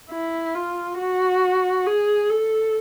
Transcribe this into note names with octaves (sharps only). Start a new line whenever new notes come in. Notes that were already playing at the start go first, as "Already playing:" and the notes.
E4
F4
F#4
G#4
A4